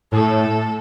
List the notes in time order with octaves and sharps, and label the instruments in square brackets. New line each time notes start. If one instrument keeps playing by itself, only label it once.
[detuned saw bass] A2 [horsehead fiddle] A4